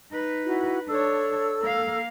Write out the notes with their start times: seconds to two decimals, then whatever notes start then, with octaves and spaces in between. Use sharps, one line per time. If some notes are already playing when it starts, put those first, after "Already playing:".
0.11 D#4 B4
0.45 E4 F#4
0.88 D4 A4 C#5 E6
1.62 A#3 F5